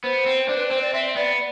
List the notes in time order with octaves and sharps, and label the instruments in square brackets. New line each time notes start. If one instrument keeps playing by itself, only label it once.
[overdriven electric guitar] B3 [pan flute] C5
[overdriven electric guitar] C4
D4
[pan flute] B4
[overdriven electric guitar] C4 [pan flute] C5
[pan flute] D5
[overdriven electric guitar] C4 [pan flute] E5
[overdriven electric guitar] B3 [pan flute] D5